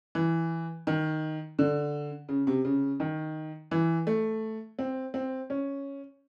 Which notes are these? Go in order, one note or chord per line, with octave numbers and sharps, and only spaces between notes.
E3
D#3
D3
C#3
C3
C#3
D#3
E3
A3
C4
C4
C#4